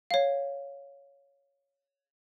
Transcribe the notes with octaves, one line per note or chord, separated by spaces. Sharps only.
C#5 F5